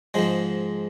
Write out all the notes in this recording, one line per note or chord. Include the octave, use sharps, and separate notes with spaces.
G#2 F3 G#3